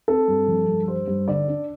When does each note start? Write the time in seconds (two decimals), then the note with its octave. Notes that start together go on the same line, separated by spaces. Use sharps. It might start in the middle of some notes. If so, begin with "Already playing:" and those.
0.08 C4 A4
0.28 G2
0.48 F3
0.68 G2
0.88 G3 C5
1.08 G2
1.28 D3 D5
1.48 D4